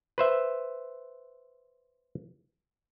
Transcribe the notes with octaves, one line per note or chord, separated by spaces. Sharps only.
B4 C5 E5